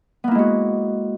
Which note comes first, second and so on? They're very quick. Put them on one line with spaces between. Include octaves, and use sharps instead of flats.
B3 A#3 E4 G#3 F#4